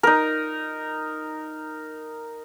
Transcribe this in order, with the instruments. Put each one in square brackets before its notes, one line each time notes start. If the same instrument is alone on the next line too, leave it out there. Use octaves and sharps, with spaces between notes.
[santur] D#4 A#4